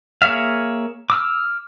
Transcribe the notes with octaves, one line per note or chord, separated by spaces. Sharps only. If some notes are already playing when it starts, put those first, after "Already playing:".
A#3 G#4 C#5 E5 F5
D6 E6 F6